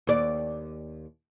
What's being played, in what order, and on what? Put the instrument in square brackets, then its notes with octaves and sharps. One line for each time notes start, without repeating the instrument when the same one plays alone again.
[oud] D#2 D5